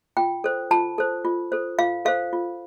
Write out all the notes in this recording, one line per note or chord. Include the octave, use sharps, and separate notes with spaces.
F4 G5
A4 C5
F4 A5
A4 C5
F4
A4 C5
F4 F5
A4 C5 F5
F4